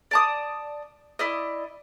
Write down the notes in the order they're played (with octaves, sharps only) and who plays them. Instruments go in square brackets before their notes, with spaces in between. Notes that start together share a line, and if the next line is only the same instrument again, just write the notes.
[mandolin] D5 A5 D#6
E4 D5 D#5